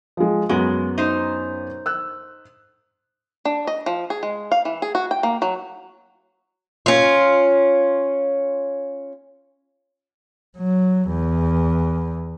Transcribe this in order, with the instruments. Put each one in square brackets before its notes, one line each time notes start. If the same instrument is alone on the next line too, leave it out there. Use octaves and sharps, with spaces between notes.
[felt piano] F3 G#3
[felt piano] F#2 B3 F#4 [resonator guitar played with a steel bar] G#3
[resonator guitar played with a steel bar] D#4 C5
[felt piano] E6 F#6
[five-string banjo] D4
D#5
F3
G#4
G#3
F5
E3
G#4
F#4
G5
A#3
F#3
[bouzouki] C#4 F4
[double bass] F#3
E2